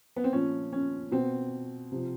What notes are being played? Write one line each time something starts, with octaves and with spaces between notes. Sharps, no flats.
B3
C4
A#2 F3 C#4
C#4
B2 C4
C3 F3